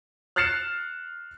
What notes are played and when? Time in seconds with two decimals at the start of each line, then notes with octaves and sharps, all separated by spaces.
0.36 F6 F#6 A6 C7 C#7 E7